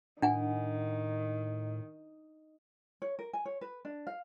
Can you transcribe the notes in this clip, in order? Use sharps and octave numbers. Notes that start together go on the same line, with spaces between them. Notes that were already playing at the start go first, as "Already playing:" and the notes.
A2 D#3 D4 F#5 G#5
C#5
A#4
G#5
C#5
B4
D4
F5